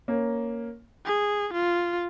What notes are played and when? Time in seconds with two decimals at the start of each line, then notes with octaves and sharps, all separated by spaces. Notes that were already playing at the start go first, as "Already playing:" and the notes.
0.08 A#3 C#4
1.05 G#4
1.53 F4